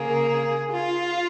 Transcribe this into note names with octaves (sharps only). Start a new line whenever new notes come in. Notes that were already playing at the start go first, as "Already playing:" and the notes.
Already playing: C#3 A#3 G#4
F4